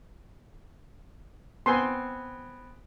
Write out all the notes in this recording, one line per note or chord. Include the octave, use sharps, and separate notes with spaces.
B3 C4 G#5 C6